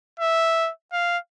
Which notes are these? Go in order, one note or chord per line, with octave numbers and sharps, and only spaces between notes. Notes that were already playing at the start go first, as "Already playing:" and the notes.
E5
F5